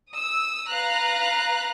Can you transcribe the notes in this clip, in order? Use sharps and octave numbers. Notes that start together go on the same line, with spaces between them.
D#6 E6
B4 F5 A#5 F#6